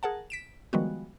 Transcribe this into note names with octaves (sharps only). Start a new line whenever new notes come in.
G#4 A#4 F#5 A5
B6 D7 E7
D#3 F3 G3 G#3 B3 F#4